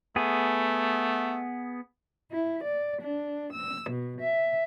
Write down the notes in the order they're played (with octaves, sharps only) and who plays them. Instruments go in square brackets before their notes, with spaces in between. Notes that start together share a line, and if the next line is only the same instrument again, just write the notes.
[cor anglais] A3 [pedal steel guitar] B3 G#4
[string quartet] E4
D5
D4
E6
B2
E5